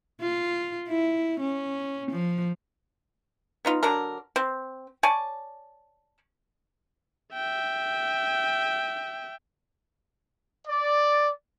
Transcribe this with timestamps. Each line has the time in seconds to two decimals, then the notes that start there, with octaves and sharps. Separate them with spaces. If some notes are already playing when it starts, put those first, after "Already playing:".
0.21 F4
0.88 E4
1.40 C#4
2.11 F3
3.65 B3 D#4 F4
3.83 D3 F#3 D4 A#4
4.36 C4
5.03 C#5 D5 G#5 A5
7.33 E5 G5
10.67 D5